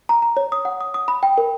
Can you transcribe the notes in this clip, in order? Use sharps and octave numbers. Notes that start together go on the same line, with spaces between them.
A#5
A#5
C#5
D#6
F#5
D#6
D#6
B5
G5
A#4